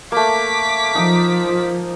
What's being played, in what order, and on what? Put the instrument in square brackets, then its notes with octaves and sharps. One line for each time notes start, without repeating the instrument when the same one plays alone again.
[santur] A3 A#3 [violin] D6 B6
[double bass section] F3 [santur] D#4 A#5